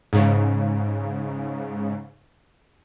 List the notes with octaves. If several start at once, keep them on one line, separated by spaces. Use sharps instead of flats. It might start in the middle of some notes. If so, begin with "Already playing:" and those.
G#2 C#3